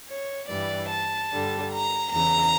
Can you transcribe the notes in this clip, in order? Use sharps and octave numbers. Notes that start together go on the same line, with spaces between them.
C#5
G2 E3 G3 D5
A5
G2 D3 G3
A#5
E2 C#3 E3 A#5